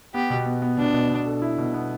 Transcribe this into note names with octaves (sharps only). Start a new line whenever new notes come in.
B3 G4
B2
B3
B3
B2 D4
B2
B2
A4
E4
B2
B3